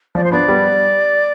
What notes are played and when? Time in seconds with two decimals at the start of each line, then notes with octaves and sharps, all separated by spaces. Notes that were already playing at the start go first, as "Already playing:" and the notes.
0.15 F3 D5
0.24 C5
0.32 B3 D4 D5
0.48 G3 B3